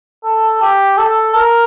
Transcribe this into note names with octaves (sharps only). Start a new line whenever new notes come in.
A4
G4
A4
A#4